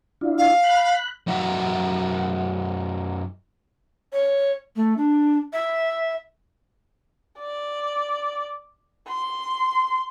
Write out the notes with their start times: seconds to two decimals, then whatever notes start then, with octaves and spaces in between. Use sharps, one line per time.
0.21 D4 E4 F4
0.38 F5
0.64 B5 F#6
1.27 F#2 D#4 F#4 E5
4.13 C#5
4.76 A3
4.98 D4
5.53 E5
7.39 D5
9.09 C6